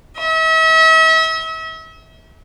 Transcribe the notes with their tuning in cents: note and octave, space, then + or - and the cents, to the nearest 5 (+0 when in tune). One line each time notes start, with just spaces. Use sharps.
E5 -40